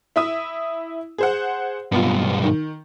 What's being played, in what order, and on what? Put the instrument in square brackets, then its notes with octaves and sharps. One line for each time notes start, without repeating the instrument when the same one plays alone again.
[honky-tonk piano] E4 E5 D#6
G#4 C5 F#5
[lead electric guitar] B1 G2 [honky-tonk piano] B3 F4
[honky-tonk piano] D#3